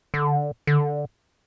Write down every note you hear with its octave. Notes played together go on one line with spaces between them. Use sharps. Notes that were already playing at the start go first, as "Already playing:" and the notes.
D3
D3